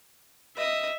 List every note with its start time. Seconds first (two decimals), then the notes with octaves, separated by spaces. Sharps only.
0.57 D#5 E5